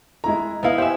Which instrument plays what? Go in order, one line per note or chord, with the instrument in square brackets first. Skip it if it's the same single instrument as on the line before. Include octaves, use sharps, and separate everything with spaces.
[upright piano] G#3 E4 A#5
[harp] B3 E4 B4 [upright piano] D#5 F5
[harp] G4 E6 [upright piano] C5 E5 G#5